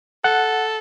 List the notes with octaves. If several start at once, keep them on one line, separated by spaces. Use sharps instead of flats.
A4 F#5